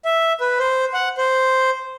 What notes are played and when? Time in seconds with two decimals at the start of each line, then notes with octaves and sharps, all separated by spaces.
0.05 E5
0.41 B4
0.59 C5
0.94 F#5
1.18 C5